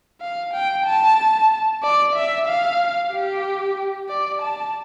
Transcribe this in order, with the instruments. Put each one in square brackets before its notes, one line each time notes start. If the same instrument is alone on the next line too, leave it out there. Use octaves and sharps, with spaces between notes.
[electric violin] F5
G5
A5
D5
E5
F5
G4
D5
A5